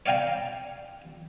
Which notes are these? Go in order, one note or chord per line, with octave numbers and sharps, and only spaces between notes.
C#5 D5 F5 G5 G#5 A#5